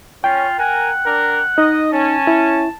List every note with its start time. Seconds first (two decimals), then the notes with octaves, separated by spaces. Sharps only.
0.24 C#4 F4 G5
0.59 A#4 F#5 G#5
1.06 D4 A#4
1.58 D#4 D#5
1.93 C#4 A5
2.27 E4